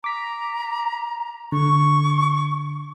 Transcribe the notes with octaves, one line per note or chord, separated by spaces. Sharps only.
A#5 D6 B6
D3 C#6